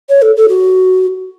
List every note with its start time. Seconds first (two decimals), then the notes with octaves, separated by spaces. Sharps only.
0.09 C#5
0.22 A4
0.36 A4
0.49 F#4